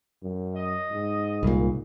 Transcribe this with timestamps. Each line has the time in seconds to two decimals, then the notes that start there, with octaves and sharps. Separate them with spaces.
0.22 F#2
0.55 D#5
0.91 G#2
1.43 C2 A#2